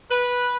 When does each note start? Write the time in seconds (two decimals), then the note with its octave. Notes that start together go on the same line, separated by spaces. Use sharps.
0.10 B4